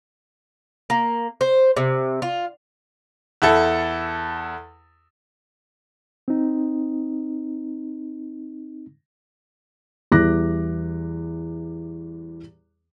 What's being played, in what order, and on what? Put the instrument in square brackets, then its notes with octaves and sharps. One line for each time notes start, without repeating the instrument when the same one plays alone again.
[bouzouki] A#3
C5
C3
F4
[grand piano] E2 E4 A4
[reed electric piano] C4 D#4
[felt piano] E2 E3 G3 D6 F#6 A#6